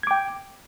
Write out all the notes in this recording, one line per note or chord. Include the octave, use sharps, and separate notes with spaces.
G5 D6 G#6